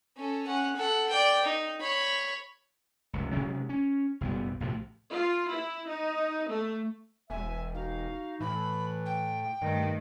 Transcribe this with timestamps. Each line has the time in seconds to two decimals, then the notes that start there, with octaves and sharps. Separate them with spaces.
0.17 C#4 A4
0.47 C#4 F#5
0.76 A4 F#5
1.09 D5 G5
1.45 D#4
1.81 C#5 B5
3.13 F1 C#2
3.32 C3 F#3 G#3 C#4
3.69 C#4
4.21 F#1 B1 G3 B3
4.60 B1 A2 C3 F3
5.10 F4
5.49 E4
5.87 D#4
6.48 A3
7.30 E1 E5 G#5
7.74 D#4 F#4 F5
8.41 A2 E3 B5
9.06 G5
9.62 G2 D#3 A3